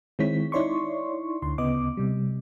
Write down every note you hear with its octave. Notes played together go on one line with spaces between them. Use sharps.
D#3 G#3 C4 E4 C#5 B6
D#4 E4 C#5 D5 C6 C#6
D2 D3 C6
D2 C#3 B3 D#5 D6
C3 G3